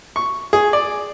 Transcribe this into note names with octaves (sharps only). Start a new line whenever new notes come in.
C#6
G#4
D5